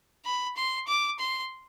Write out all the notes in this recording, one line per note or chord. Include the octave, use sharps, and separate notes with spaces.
B5
C6
D6
C6